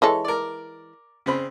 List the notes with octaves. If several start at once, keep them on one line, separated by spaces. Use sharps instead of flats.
E3 G#3 A4 C#5
A#4 D5
C#3 C4 B5